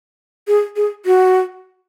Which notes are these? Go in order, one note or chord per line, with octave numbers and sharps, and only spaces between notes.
G#4
G#4
F#4